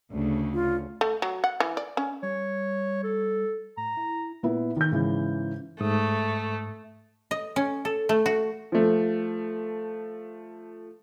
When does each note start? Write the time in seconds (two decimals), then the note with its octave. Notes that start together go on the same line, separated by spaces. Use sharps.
0.12 D2 C#3
0.54 F4
1.01 A3
1.22 F#3
1.44 F#5
1.60 E3
1.77 D5
1.97 C#4
2.23 G3 C#5
3.04 A4
3.77 A2 A#5
3.97 E4
4.43 A#2 B3 E4
4.76 D#3 G6
4.91 G#2 C#3 E3
5.81 G#2 A3 D#6
7.31 D#5
7.56 C#4
7.85 A4
8.09 A3
8.26 F#4
8.72 F3 A3